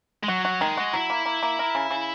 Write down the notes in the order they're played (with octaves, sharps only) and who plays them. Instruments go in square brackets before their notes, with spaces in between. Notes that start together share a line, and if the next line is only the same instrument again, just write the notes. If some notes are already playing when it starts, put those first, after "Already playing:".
[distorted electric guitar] G#3
[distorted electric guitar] F#3 [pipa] F#4
[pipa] F#4
[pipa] D#3 [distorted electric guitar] G#3
[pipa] F#4
[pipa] F#3 [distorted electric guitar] E4
[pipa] A#3
A#3
A#3
A#4
C#3
C#3